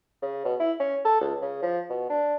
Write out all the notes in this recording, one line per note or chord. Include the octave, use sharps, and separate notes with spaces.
C#3
B2
E4
C#4
A4
C#2
C#3
F3
B2
D4